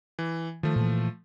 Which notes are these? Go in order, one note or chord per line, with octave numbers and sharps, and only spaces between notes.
E3
D#3 F3 A3
A#2 E3